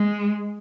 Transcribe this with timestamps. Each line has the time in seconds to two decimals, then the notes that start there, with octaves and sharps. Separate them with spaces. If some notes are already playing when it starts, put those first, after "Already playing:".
Already playing: G#3